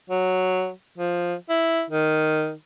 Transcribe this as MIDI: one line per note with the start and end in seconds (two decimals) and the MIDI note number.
0.10 0.70 54
0.98 1.34 53
1.49 1.83 64
1.90 2.52 51